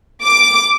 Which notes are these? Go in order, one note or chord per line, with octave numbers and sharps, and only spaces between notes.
D6